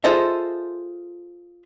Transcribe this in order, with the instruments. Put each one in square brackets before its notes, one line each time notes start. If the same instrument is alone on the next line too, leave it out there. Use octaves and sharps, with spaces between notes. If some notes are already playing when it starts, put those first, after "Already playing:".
[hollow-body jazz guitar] F4 G#4 A4 C5 D#5 E5